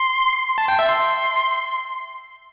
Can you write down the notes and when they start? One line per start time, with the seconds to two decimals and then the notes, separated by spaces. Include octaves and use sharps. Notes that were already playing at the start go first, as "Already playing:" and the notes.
Already playing: C6
0.58 A5
0.68 G5
0.79 E5
0.89 C6